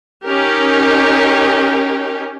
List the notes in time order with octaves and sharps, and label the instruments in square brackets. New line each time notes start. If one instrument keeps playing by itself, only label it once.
[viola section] C#4 D#4 G4 A#4